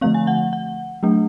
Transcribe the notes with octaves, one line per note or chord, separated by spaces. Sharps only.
D3 F3 A3 C4 F5
G#5
F#5
F#5
F#3 A3 D4